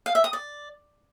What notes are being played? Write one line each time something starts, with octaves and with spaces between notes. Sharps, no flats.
F5
E5
D#6
D5